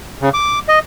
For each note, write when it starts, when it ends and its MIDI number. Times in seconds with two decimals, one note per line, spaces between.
0.22 0.29 49
0.34 0.59 86
0.68 0.79 75